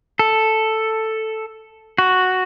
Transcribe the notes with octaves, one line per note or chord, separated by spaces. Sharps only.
A4
F#4